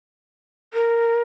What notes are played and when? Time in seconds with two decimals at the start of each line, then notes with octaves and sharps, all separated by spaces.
0.74 A#4